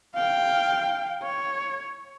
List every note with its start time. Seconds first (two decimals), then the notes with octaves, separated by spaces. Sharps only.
0.15 F5 G5
1.23 C#5